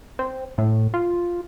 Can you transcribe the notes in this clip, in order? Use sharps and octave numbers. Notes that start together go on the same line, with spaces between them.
C4
A2
F4